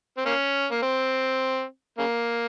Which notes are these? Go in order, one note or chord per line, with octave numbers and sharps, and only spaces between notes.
C4
A#3 C#4
A#3
C4
C#3 A#3